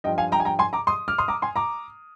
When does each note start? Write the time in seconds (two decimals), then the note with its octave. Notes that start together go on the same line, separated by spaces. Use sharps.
0.04 G2 F3 D#5 G5
0.18 F5 G#5
0.32 G5 A#5
0.40 G#5
0.45 G5 A#5
0.59 G#5 C6
0.73 A#5 D6
0.87 C6 D#6
1.08 D6 F6
1.18 C6 D#6
1.28 A#5 D6
1.42 G#5 C6
1.56 A#5 D6